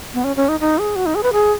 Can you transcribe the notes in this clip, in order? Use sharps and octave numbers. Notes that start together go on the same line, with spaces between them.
B3
C#4
C#4
D#4
D#4
G#4
F#4
D#4
G#4
B4
G#4